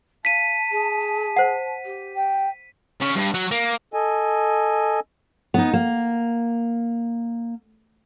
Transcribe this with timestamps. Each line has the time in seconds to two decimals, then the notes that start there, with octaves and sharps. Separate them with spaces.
0.25 F5 A5 B6 D#7
0.71 G#4
1.36 C5 F#5
1.85 G4
2.16 G5
3.01 C#3
3.16 G2
3.34 F#3
3.51 A#3
3.94 A4 D#5 G#5
5.54 B3 D#4
5.73 A#3